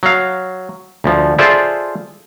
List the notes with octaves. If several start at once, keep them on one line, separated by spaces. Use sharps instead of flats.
F#3 F5
D2 F3
F4 G#4 A4 C5 D5 E5